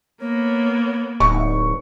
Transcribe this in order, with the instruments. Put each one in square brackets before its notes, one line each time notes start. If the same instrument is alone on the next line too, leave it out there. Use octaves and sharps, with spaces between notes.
[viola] A#3 B3 [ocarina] C#5
[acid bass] D1 [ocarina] D#4 [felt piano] C#6